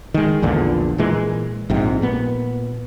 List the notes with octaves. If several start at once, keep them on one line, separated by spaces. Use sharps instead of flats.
D#3 G#3
A#1 E2 A#2 D3
A#2 E3 G#3
A#1 G#2 C3
A#2 B3